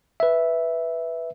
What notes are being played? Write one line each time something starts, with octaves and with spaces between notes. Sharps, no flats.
B4 E5